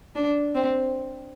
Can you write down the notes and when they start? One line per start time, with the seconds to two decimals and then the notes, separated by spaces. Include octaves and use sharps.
0.15 D4
0.55 C4